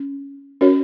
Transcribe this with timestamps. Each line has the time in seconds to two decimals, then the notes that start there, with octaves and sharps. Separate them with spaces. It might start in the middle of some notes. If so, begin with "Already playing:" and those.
Already playing: C#4
0.61 C#4 F#4 A#4 C#5